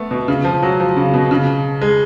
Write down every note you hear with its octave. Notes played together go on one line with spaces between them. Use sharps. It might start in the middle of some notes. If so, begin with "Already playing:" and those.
Already playing: A3 B3
B2
C#3
F3
F#3
F3
C#3
B2
C#3
G#3